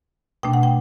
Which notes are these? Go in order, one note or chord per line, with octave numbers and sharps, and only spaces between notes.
B2 A3 D4 G5
F#5
G5